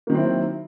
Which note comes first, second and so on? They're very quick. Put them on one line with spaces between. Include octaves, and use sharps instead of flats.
A#3 D#3 F#3 C4 E4